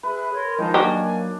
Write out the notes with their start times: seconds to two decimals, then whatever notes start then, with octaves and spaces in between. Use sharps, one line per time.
0.03 G#4 B4 E5 F#6
0.34 A#4 C#5 C6
0.59 D#3 F3 G#3 D#4 F4 A5 G6
0.74 F#3 A#3 D4 F#4 G4 G#5